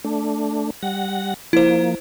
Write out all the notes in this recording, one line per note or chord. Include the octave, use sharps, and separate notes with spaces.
A3 D4
G3 F#5 A#6
F3 A#3 E4 C5